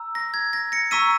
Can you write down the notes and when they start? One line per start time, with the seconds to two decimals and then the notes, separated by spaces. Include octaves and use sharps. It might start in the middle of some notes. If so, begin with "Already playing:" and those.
Already playing: A#5 E6
0.15 A#6
0.34 G#6
0.53 A#6
0.72 A#6 C#7
0.91 A#5 C#6 E6 B6 D#7